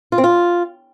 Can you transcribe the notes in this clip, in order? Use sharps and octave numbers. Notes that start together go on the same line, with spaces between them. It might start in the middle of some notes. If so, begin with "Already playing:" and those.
F4
C4
F4